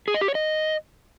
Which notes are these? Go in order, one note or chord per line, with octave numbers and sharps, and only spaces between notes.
G#4
D#5
G4
C#5
D#5